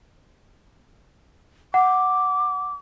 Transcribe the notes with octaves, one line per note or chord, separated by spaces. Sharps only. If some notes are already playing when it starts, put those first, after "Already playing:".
F#5 D6